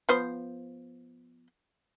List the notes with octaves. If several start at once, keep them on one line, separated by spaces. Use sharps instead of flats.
F3 B3 C5